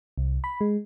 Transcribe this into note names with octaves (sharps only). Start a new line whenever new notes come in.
C2
B5
G#3